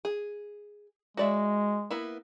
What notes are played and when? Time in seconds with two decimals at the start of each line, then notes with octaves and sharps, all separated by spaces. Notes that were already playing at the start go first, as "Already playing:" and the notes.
0.05 G#4
1.17 G#3 F#4 D5 E5
1.90 A#3 B3 E4